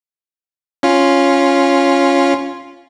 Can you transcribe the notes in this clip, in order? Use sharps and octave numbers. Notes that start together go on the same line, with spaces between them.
C#4 F4